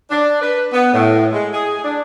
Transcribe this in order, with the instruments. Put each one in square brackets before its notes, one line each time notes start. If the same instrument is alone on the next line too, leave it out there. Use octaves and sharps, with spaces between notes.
[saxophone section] D4
B4
B3
A2
G#3
G#4
D4